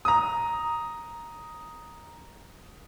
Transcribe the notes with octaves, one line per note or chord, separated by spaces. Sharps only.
A#5 D#6